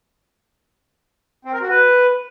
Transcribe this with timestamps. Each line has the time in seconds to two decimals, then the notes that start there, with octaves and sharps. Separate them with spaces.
1.45 C4
1.53 A#4
1.62 F#4
1.70 B4